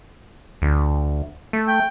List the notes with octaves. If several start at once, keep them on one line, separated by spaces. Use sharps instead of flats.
D2
A3
G5